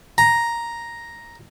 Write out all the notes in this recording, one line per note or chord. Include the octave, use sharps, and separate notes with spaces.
A#5